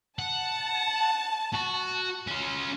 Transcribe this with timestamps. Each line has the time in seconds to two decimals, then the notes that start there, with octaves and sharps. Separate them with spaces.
0.19 F#5 A5
1.53 F#4
2.27 C#4 F4